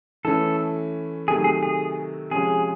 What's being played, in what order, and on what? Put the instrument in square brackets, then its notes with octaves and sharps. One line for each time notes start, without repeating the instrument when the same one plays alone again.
[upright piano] E3 A3 C#4 [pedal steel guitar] A4
[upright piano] C3 D#3 F#3 A3 [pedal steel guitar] G#4
[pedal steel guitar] G#4
G#4
[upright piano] C3 F3 G#3 C#4 [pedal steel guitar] G#4